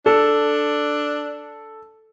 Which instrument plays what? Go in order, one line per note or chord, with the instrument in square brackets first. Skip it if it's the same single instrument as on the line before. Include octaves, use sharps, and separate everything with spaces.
[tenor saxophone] D4 [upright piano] A4